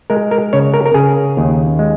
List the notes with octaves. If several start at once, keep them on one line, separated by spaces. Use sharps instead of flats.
G#3 A#4
A#4
C#3 C#5
A#4
A#4
C#3 G#4
D#2
G#3